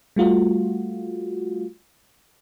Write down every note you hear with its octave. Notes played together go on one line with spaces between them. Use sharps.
G3 A3 F4 F#4